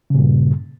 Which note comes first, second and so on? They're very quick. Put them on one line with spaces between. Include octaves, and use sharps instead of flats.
C#3 A#2 G2